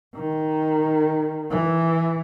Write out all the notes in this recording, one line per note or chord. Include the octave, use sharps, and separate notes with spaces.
D#3
E3